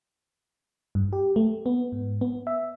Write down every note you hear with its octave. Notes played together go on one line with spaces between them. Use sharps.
G2
G4
A3
B3
G#2
B3
E5